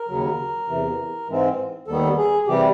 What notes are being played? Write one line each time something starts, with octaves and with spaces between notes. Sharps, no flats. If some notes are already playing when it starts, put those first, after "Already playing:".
Already playing: A#4
D#2 C#3 F#3
E2 C3 E3
G#2 E3 G#3 C4
D#2 D#3 G3 B3 A4
G#4
C3 E3 G3 G4